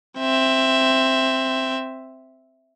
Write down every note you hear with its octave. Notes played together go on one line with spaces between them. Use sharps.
C4 E5